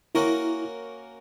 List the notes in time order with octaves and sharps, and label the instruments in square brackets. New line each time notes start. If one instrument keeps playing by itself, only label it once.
[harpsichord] A#3 C#4 F#4 A#4 [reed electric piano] E4